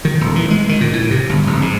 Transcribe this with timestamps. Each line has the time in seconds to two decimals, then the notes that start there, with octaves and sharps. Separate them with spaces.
0.05 D#3
0.21 D#1
0.36 E3
0.50 G#3
0.69 D#3
0.81 A#2
0.93 A2
1.11 C3
1.29 G1
1.47 F1
1.62 G#2